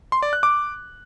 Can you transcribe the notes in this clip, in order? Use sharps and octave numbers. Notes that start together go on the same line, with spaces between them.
C6
D5
F#6
D6